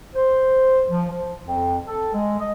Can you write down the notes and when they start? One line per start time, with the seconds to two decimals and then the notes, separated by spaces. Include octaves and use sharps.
0.14 C5
0.88 F3
1.11 F3
1.45 F2
1.86 A4
2.13 G#3
2.39 D#5